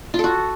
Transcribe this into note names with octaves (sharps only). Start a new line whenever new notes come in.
F4
A4
F#4